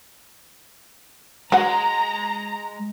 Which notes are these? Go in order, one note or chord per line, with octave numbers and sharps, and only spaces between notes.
F#3 G#3 F#5 A#5